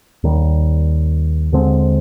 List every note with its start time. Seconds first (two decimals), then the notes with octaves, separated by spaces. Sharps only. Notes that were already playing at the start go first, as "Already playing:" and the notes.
0.23 D#2 D#3 G3
1.52 D#2 D3 G#3 C4